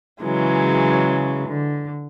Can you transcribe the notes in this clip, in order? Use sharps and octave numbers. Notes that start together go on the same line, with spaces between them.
C#3 E3 F#3 G#3
D3